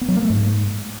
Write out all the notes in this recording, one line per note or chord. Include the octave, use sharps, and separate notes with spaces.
B3
F#3
A#3
A3
G#2